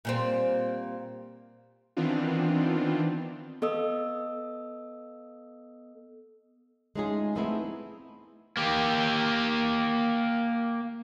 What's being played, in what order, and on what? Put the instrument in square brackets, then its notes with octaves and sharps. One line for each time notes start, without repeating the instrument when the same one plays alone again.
[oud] A#2 G3 C4
[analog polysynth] D#3 E3 B3 C4 D4 F4
[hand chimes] B3 A4 D#5 D#6 E6
[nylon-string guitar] G#3 A3 C#4 D#4 F4 G#4
A3 B3 C4 D#4 E4 G#4
[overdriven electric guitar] A#3 G4